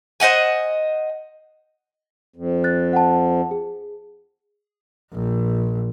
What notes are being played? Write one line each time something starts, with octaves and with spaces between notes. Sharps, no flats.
C5 D#5 F#5 G#5
F2
F#6 A6
F#5 G5 A5
G#4
A#1